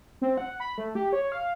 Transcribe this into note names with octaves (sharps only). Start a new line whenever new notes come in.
C4
F#5
B5
A3
G4
C#5
F5